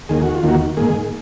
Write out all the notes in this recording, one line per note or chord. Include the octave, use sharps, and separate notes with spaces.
D#2 D#3 A#3 G#4
F#4
F4
D#2 D#3 A#3 F#4
G#2 D#3 A#3 G#4